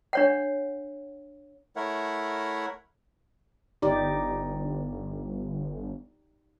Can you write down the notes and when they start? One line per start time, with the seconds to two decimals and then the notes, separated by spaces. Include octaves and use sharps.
0.13 D4 C#5 F#5
1.76 A3 E4 A#4 C#5 E5 F#5
3.82 G1 D#4 G4 D5